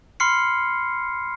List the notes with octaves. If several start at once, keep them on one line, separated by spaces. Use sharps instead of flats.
B5 C6 F6 C7 C#7